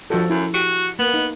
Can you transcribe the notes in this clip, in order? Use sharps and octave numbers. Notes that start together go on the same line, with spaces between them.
G2 F3 F#4 A4
F#2 E4
F#4 G4
A#3 B3
D#4